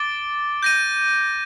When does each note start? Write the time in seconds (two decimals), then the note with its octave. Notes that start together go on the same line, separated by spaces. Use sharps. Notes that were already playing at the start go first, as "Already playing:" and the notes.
Already playing: D6 A6 D7 G7
0.63 G6 A#6 D#7